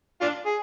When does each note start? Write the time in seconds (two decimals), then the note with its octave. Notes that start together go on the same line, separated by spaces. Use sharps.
0.21 D4 F4
0.46 G#4